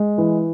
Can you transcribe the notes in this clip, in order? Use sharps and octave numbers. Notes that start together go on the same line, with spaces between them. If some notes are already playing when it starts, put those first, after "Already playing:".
Already playing: G#3
E3